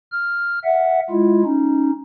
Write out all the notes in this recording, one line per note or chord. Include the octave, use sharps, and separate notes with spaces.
F6
E5 F#5
G#3 E4 F4
C#4 D#4